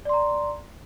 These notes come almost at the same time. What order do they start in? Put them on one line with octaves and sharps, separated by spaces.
D5 C6 A#5